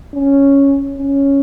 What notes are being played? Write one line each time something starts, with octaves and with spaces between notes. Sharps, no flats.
C#4
C#4